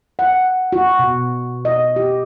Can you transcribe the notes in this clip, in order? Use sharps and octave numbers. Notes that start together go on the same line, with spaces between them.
F#5
F#4
B2
D#5
G4